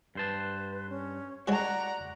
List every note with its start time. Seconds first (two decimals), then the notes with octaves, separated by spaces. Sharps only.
0.15 G2 B4 C5 A5
0.89 C#4
1.48 G3 G#3 F#4 C#5 D5 F#5 A#5